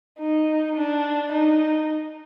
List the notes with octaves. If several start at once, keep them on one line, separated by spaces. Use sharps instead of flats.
D#4
D4
D#4